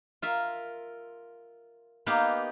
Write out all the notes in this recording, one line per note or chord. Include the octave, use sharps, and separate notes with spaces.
F4 A#4 E5
A#3 B3 D#4 G4 F5